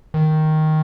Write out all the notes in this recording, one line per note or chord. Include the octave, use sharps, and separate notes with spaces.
D#3